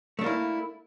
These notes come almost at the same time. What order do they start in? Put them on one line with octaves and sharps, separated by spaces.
A3 D4 A#3 E4